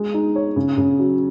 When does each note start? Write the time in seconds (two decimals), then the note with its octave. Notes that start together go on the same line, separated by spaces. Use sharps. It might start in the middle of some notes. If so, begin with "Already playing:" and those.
Already playing: G#3
0.14 D#4
0.36 C#5
0.56 C#3
0.78 C#3
1.00 F#3